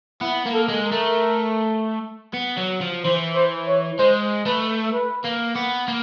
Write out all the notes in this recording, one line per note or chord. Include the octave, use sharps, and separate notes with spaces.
B3 E4
A#3
A4
G#3
A#4
A3
B3
F#3
F3
E3 C5
C5
C#5
G#3 C5
A3 B4
B4
A#3
B3
A#3